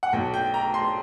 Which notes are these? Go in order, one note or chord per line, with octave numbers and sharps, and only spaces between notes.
F#5
B1 B2 G5
G5
A#5
C6